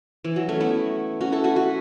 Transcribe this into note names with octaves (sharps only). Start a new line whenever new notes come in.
E3
F#3
A3 C#4
B3 E4
C#4 F#4
E4 A4
F#4 B4
F#4 B4